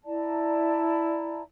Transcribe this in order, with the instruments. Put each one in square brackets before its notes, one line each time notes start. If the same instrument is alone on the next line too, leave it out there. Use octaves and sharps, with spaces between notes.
[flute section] E4 D5 A5 A#5